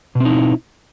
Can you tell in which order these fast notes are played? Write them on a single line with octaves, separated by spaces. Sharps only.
B2 C4 D#4 E4